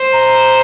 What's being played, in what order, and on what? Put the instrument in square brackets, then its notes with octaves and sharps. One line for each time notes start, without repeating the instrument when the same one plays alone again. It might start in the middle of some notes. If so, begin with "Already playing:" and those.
Already playing: [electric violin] C5
[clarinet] A#5